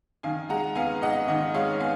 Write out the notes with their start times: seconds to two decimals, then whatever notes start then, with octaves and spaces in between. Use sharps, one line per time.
0.23 D#3 F5 G#5
0.49 G#3 F#5 A#5
0.75 B3 F5 G#5
1.02 G#2 D#5 F#5
1.28 D#3 D#5 F#5
1.54 G#3 C#5 F5
1.80 B3 F5 G#5